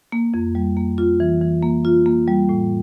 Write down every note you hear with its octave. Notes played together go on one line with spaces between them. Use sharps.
A#3
F2
G3
A#3
F4
E3
E3
A#3
F4
A#3
G3
A2